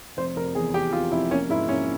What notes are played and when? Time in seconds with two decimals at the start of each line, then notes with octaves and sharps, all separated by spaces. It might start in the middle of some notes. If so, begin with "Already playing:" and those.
0.17 F1 C5
0.36 F1 A#4
0.55 E2 G#4
0.74 E2 G4
0.93 C3 F4
1.12 F1 E4
1.31 A#3 C#4
1.49 G#2 E4
1.69 A#3 C#4